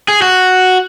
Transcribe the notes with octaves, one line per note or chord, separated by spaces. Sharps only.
G#4
F#4